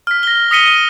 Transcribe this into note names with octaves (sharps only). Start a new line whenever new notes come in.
F6 B6
A#6 G7
D#6 A#6 B6 C#7 D#7 G7